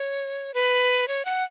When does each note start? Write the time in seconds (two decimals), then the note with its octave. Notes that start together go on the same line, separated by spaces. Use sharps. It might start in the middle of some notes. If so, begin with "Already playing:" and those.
Already playing: C#5
0.54 B4
1.08 C#5
1.25 F#5